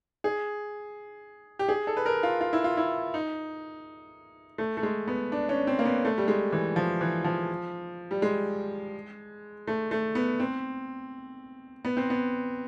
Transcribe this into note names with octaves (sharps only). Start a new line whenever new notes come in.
G#4
G4
G#4
A4
B4
A#4
F4
F4
E4
F4
E4
D#4
A3
A3
G#3
B3
D4
C#4
C4
A#3
B3
A3
G3
G#3
E3
F3
E3
F3
G3
G#3
A3
A3
B3
C4
B3
C4
B3